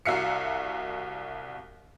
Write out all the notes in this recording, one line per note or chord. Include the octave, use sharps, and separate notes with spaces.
C2 F#4 E5 F5 C7 C#7